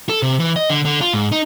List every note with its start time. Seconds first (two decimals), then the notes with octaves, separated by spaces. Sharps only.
0.09 A4
0.22 C3
0.39 E3
0.56 D#5
0.70 D3
0.85 D3
1.01 F4
1.14 G#2
1.32 D#4